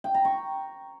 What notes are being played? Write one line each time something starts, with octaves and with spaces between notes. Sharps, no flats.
G5
A#5
C#6